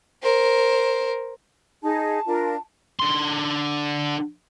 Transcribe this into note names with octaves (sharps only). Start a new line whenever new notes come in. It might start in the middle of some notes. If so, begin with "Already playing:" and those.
A#4 C5
D#4 G#4 A5
D4 F4 A#4
D3 C6